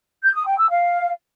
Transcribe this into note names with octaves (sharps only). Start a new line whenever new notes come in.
G6
D#6
G5
E6
F5